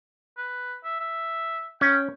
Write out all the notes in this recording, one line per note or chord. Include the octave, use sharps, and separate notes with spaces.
B4
E5
E5
C#4 G5